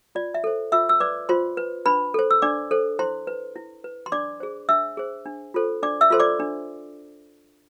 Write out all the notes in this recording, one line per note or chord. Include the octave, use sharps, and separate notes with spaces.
F4 D5
E5
A4 C5
F4 E5 E6
E6
B4 D5 D6
F4 C5 C6
B4
D4 B4 B5
A4 C5
E6
D4 D5 D6
A4 C5
E4 C5 C6
B4
E4
B4
C6
D4 D5 D6
G#4 C5
D4 E5 E6
G#4 C5
D4
F4 A4 C5
D4 D5 D6
E5 E6
F4 A4 C5 C6
D5 D6
D4